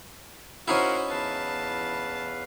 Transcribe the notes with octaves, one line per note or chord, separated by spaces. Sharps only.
C#4 D#4 E4 F#4 A#4 C5 F5 F#5
E2 B4 F5 A5